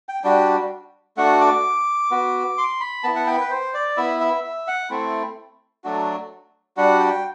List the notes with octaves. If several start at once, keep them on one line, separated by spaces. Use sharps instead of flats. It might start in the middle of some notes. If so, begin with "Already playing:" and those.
G5
G3 D4 F#4 G5
A3 D4 F#4 F#5
D6
B3 F#4
C6
B5
B3 E4 A5
F#5
G5
B4
C5
D5
B3 E4 E5
E5
E5
F#5
A3 C4 E4
F#3 A3 D4 F#4
G3 D4 F#4 F#5
G5